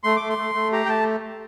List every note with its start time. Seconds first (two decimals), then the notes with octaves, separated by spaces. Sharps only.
0.04 A3 C6
0.16 A3 D6
0.29 C6
0.38 A3
0.55 A3
0.72 G4 A#5
0.85 G5
0.89 A3 A5